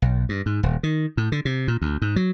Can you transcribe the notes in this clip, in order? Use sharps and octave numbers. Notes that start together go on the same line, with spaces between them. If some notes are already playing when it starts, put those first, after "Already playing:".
B1
G2
G#2
D#1
D#3
A2
D3
C3
A#2
D2
G#2
F#3